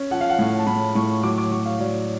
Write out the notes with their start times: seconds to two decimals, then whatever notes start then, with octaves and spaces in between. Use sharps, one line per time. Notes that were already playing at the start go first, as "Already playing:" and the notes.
Already playing: C#4
0.11 F3 F#5
0.21 F5
0.30 F#5
0.39 A2
0.59 A5
0.67 A2 B5
0.95 A2 C#6
1.23 F#3 D6
1.38 D6
1.51 F#3 C#6
1.65 F5
1.79 F#3 D5